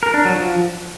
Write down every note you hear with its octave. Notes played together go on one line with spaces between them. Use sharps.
A#4
D4
F#3
F3